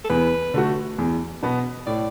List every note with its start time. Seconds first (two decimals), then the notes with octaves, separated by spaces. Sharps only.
0.04 A4
0.10 E2 B4
0.54 D3 A3 F#4
0.98 E2
1.43 B2 B3
1.87 A2 D5